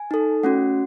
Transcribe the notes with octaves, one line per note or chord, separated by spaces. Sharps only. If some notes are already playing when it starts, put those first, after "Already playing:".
Already playing: G#5
D#4 A4
A3 C#4 F#4 F#5